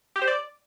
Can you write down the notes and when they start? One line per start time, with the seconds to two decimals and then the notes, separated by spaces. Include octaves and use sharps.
0.16 G4
0.22 C5
0.27 D5